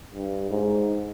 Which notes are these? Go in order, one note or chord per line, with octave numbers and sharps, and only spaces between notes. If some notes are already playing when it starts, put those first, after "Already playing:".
G2
G#2